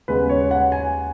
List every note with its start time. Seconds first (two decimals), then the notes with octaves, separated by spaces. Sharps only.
0.08 D#2 C#3 G#3 B3 B4
0.29 C#5
0.51 F#5
0.72 G#5